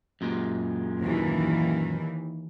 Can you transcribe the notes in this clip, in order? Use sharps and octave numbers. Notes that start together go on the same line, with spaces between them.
F#2 A#2 G#3
D#2 E3